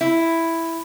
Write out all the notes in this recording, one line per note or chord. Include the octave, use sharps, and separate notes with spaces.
E4